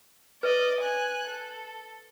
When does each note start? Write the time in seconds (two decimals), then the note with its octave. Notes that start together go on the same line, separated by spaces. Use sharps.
0.43 B4 D5 D#5
0.81 G#5 F#6
1.28 A4